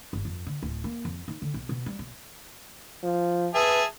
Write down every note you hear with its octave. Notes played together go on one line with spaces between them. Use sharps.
G1
F2
D3
D1
A#3
F2
D#4
D3
B1
B2
G3
B1
F3
G#4 B4 E5 A5